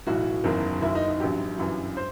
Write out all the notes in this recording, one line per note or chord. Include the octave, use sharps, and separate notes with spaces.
B1 A2 E3 F#4
F#1 E2 D#3 F#3
F#1 F#2 D#3 E4
D#4
D#4
A1 G2 F#3 G4
G1 F#2 E3
C5